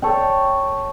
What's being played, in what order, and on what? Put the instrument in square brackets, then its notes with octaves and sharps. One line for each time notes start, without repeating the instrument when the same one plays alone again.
[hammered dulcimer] A4 C#5 G5